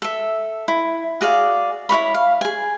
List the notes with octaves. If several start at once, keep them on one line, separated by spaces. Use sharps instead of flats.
A4 E5
E4
F#4 G#4 D5 F5
E4 F#4 C#5 B5
F5
G#4 G#5